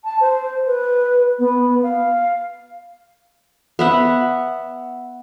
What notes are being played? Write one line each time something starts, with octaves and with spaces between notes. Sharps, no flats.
A5
C5
B4
B3
F5
B3 E5 F#5